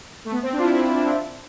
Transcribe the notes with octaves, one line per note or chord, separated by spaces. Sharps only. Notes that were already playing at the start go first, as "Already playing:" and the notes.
A3
B3
C4
D4
F4
E4
E4
E4
D4
C4